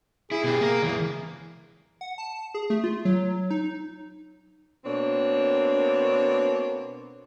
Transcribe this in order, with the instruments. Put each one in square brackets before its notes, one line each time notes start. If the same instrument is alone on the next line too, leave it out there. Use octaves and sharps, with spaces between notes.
[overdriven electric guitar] E4 [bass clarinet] G#4
[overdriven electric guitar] B2 G4
A#3 A#4
C#2 E3
[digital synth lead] F#5
A5
G#4
A3
F4
F#3
D#4
[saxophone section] B2 A#3 C4 D4 C#5